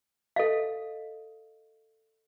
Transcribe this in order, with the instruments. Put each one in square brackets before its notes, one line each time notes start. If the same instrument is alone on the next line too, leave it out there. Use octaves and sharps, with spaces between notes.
[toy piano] A4 D#5 F5